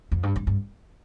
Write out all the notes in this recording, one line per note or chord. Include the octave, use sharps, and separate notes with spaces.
F2
G2
G2
G2